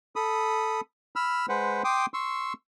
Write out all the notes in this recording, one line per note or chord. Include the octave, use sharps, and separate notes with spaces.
A4 B5 D#6
B5 E6 F6
G#3 B4 C5 F#5
G5 C6 D6 D#6
C6 C#6 E6